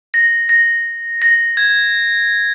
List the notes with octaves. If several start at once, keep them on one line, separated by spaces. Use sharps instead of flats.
A#6
A#6
A#6
G#6